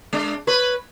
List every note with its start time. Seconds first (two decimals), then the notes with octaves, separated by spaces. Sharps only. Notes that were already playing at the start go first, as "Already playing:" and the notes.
0.13 G#3 D4
0.47 B4 C#5